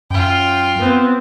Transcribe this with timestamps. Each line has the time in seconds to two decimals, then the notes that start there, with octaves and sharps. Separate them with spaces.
0.11 F#2 F4 G5
0.80 B3 C4